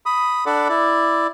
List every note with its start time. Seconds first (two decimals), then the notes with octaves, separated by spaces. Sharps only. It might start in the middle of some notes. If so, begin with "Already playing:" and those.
0.06 B5 D#6
0.46 D4 A4 D5 F#5 B5 D6
0.69 E4 D5